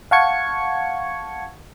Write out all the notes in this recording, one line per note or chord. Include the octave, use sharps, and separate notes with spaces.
F5 F#5 A5 C#6 G#6 C#7